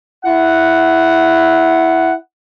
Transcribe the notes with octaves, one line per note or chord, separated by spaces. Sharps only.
E4 F#5